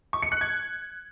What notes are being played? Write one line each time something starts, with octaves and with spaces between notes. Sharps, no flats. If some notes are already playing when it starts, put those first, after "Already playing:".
C#6
C#7
F#6
G#6